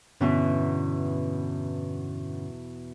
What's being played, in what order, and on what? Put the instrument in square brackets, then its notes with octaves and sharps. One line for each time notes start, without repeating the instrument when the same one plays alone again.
[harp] E2 B2 E4 [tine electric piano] G2 D3 C#4